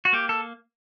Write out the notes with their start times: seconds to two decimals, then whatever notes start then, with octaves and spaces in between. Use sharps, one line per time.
0.05 F#4
0.13 A#3 G4
0.29 A4